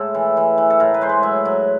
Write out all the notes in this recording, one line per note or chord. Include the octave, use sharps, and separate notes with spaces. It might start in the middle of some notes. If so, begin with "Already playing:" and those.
Already playing: A2 G#3 A4
E3
E3
E3
A4
A2 A#4
B4
G#3 C5
B4
F#3 E5
F#3